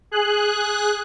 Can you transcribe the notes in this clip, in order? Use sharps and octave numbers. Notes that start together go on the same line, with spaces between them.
G#4 F#6